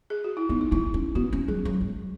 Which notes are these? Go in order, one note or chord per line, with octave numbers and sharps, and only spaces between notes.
G#4
F#4
E4
B3 D#4
D#4
D#4 E4
C#4
B3 F#4
C#4
F#3 G#4
F#3
G#3